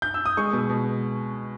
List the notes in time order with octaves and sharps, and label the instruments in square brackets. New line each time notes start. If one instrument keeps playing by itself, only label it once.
[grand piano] G6
E6
D#6
G#3 C#6
B2
B2